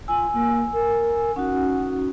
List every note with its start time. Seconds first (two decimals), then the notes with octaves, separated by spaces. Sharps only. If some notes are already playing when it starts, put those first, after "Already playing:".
0.08 F4 G#5 E6
0.34 A#3
0.73 A#4
1.36 C#4 D#4 F#4 F#5